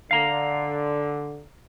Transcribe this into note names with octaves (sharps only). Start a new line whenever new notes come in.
D3 F5 A#5